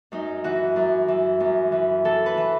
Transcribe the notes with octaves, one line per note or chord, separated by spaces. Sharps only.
F#2 D#4
E3 F#4
F#2
E3
F#2
E3
E3 A4
B4
E3